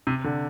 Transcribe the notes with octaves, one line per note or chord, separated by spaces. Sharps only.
C3
D3